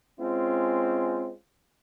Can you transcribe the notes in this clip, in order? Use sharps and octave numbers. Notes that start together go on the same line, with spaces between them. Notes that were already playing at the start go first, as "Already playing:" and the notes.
G#3 C4 C#4 F4